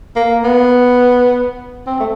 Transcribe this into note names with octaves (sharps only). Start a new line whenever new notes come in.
A#3
B3
C4
A3